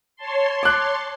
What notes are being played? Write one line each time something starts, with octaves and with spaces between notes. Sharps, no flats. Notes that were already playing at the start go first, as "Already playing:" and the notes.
C#5 A5 C6
D6 F#6